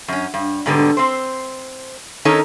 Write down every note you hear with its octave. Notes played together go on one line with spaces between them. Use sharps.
F#2 C#4
G2
G#2 B2 D3 G3 B3
C4 C5
D#3 C#4 D#4 A4 A#4 C#5